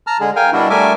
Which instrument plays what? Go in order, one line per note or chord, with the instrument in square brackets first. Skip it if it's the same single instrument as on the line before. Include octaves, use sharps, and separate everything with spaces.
[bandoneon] A5 A#5 F6
D3 G#3 G#4
A#4 F5 G5 G#5
B2 G3 D4 E4 F#4
G3 A3 A#4 E5 G#5 D6